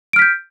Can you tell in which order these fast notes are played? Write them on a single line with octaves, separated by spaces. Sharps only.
D7 F6 B6 G6